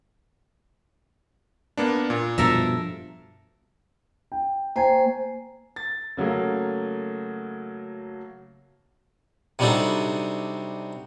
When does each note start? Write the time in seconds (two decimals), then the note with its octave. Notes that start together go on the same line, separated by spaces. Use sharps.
1.77 A#3 B3 D4
2.10 A#2
2.38 G2 B2 F3 A4 A#4 E5
4.32 G5
4.76 A#3 C5 G5 G#5
5.76 A6
6.17 C#3 F#3 A3 A#3
9.59 C3 F#3 G3 D4 D#4 A4